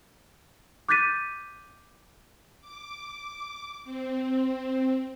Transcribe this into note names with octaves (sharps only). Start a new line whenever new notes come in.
D6 F#6 G6 A6 B6 D#7
D6
C4